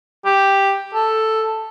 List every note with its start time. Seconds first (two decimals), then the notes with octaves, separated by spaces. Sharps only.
0.25 G4
0.94 A4